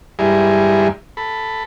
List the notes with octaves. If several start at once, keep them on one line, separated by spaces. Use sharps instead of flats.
G2 G3 G#3 E4 G#5 A#5
A4 B5